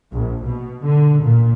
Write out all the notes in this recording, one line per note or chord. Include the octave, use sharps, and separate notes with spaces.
A#1
B2
D3
A#2